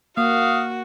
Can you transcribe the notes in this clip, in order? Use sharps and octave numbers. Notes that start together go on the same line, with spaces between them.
A#3 F#4 F5 D#6